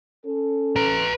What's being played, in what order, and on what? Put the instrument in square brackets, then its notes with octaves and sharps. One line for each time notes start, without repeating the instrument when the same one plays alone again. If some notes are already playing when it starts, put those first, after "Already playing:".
[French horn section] C#4 A4
[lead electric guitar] B4 A#5